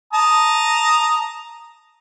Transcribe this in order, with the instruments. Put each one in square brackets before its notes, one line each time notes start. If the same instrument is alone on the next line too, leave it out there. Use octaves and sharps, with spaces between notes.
[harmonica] A5 A#5 D#6